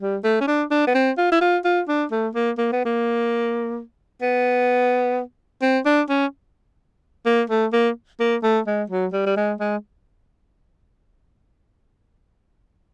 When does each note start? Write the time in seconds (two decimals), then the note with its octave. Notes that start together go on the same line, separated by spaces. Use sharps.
0.01 G3
0.24 A3
0.41 C#4
0.47 D4
0.71 D4
0.87 B3
0.95 C4
1.18 F4
1.32 E4
1.41 F4
1.65 F4
1.88 D4
2.11 A3
2.35 A#3
2.58 A#3
2.72 B3
2.85 A#3
4.22 B3
5.62 C4
5.86 D4
6.10 C#4
7.26 A#3
7.50 A3
7.73 A#3
8.20 A#3
8.43 A3
8.67 G#3
8.90 F#3
9.13 G3
9.26 G3
9.37 G#3
9.60 G#3